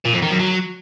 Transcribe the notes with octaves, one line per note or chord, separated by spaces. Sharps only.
A#2
F2
D#3
F#2
F#3